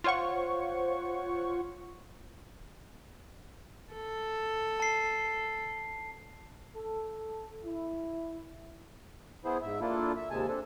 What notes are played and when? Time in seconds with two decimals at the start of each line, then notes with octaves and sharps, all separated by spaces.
0.04 F4 C5 C#5 F#5 C#6
3.93 A4
4.80 A5 C7
6.76 A4
7.64 E4
9.45 B3 E4 G#4 C5
9.62 G#2 E5
9.81 A#3 D4 E4 F4 A4
10.16 E5
10.30 D#2 C3 G#3 G#5 A5
10.48 C4 D4 A4